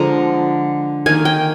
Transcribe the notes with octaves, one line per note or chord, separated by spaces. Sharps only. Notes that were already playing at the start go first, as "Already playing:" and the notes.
Already playing: D3 F3 G#3 A#5
D#3 A#3 G#5
G5